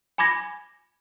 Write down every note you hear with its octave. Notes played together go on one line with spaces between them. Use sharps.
G#5 B5 D6 G#6 A#6